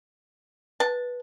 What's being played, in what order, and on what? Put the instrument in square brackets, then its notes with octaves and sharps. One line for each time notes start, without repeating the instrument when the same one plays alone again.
[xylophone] B4 [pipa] A5